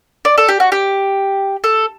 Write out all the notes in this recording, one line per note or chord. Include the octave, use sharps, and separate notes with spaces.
D5
A4
G4
F#4
G4
A4